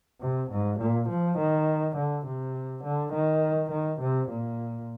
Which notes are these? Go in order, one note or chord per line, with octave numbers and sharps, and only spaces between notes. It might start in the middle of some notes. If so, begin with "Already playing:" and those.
C3
G#2
A#2
F3
D#3
D3
C3
D3
D#3
D#3
C3
A#2